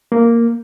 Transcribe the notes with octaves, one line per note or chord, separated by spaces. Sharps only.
A#3